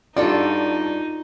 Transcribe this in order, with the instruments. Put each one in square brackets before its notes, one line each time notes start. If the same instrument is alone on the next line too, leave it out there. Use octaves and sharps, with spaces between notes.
[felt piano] G2 D4 [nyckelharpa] D#4 [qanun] F4 F#4 A4 [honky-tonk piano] D5